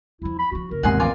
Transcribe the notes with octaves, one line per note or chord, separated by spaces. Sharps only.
E2 F3 E4
B5
F3 D4 F#4
F#1 A#4
E1 D#2 G#2 C3 F#5 G#5 C6
A1 F2 F4 D5 G#5